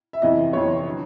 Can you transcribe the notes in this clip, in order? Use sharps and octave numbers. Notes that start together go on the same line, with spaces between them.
E5
F2 C3 E3 D#5
F2 C3 E3 C#5
D3 F#3